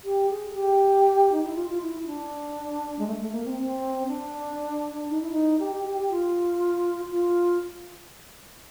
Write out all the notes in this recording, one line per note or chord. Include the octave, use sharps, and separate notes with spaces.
G4
G#4
G#4
G4
D#4
E4
F4
F4
E4
E4
D4
G#3
A3
A3
A#3
C4
C4
D4
D#4
E4
D#4
G4
G4
G4
G4
F4
F4